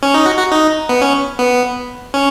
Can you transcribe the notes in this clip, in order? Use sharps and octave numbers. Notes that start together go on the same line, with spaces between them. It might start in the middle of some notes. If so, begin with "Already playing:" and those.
C#4
D#4
F#4
F#4
D#4
B3
C#4
B3
C#4